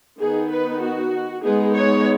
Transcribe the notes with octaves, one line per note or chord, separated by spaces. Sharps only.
D#3 B3 D#4 G#4
B4
F#4
G#3 B3 D#4 G#4
C#5